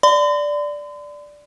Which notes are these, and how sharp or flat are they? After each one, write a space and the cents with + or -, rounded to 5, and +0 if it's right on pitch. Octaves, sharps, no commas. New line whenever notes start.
D5 +0 C6 -45